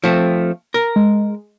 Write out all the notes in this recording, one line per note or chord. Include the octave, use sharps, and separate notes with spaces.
F3 A3 C4
A#4
G#3